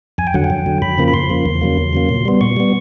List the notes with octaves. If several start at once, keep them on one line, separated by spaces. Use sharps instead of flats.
F2 G#5
G5
D3 F#3 F#5
G5
F2
D3 F#3
F2 B5
C#3 F3 A#3
B5
F2 C6
C#3 F3 A#3
E2
C#3 F#3 A#3
E2
C#3 F#3 A#3
A#2
G3 B3
A#2 C#6
G3 B3